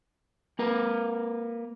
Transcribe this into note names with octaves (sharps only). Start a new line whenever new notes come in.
A#3 A#4 B4